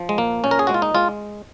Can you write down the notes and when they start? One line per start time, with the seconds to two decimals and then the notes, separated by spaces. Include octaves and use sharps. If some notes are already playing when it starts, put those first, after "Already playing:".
Already playing: F3
0.09 G#3
0.18 A#2 A#3
0.44 A#2 C#4
0.51 A#4
0.59 G#4
0.67 G#3 F#4
0.74 F4
0.82 D#4
0.95 G#3 F4